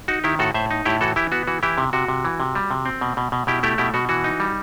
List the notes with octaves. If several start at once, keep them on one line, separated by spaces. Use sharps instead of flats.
D#4 F#4
D#3 E4 G4
A2 F#4 A4
A2 C5 E5
D#4
A2 E4 G4
E3 F#4 A4
E3 E4 G4
B3 F#4
E3 F#4
E3 E4 G4
C3
C3 F#4
C3
E3
C3
G3
C3
C4
B2
B2
B2
B2 E4 G4
A3 E4 G4
B2 E4 G4
B2 F#4
E3 F#4
D#4
G3